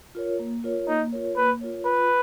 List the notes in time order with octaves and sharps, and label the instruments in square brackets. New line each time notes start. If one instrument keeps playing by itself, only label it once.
[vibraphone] F4 A#4 C#5
A#3
F4 A#4 C#5
[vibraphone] A#3 [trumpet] D#4
[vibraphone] F4 A#4 C#5
[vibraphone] A#3 [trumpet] B4
[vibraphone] F4 A#4 C#5
[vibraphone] F4 [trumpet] B4